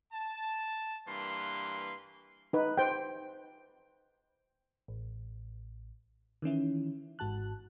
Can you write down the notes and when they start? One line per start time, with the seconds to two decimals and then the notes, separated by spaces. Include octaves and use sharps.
0.13 A5
1.07 G2 E3 A#3 B4 C6
2.53 D#4 B4
2.78 C5 G5
4.88 A1
6.42 D#3 E3 C#4 E4
7.19 G#1 G#2 F#4 A5 F#6